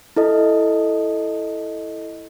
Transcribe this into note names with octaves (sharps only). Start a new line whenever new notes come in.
E4 A4 D#5